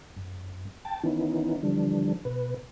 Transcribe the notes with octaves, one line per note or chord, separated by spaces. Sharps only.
F#2
G5 A5 A6
D#3 E3 B3 C#4 D#4 E4
D3 E3 F3 G3 D4
B2 B4